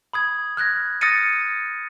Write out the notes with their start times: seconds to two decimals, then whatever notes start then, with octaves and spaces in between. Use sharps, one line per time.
0.13 B5 D#6 G#6
0.57 F6 F#6 G#6 A#6
1.01 D#6 F6 A6 A#6 C#7 D#7